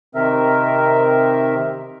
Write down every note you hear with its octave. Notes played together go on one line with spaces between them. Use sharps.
C3 D#3 C4 A#4 E5